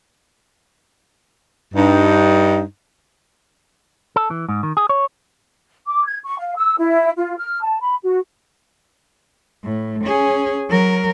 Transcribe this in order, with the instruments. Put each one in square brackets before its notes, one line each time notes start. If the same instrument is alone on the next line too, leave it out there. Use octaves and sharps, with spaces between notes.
[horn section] G2 D#4
[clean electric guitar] A4
E3
G#2
D#3
G#4
C#5
[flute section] D6
G#6
C#6
F5
E6
E4
F4
F6
A5
B5
F#4
[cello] A2
C#4 G#4
F#3 A#4